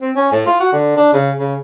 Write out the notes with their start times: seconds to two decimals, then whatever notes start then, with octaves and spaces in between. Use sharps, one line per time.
0.01 C4
0.16 C#4
0.32 A2
0.46 F4
0.60 F#4
0.72 D3
0.97 D4
1.13 C#3
1.40 C#3